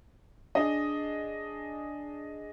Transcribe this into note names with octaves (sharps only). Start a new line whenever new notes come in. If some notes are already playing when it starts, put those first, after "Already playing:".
D4 G#4 D#5